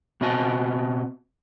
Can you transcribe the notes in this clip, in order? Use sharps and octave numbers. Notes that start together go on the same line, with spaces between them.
B2 C4 F#4 D#5 G#5 A5